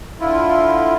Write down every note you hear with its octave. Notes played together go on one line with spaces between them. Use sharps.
D3 E4 F4